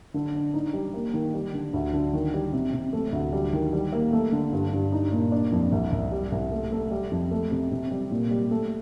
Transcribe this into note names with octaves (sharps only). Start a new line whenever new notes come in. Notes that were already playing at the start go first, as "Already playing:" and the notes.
D3
D4
D#4
G3
A#3
D#3
G3
D3
D2
D3
D#3
G3
C3
C3
A3
D2
G3
D#3
G3
A#3
A3
D3
G2
G2
D#4
A#2
D4
F2
C2
C2
G3
C2
A3
A3
G3
F2
A3
C3
C3
G3
A#2
G3
A3